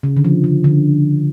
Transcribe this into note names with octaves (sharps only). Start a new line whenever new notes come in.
C#3
D3
F3
C#3
D3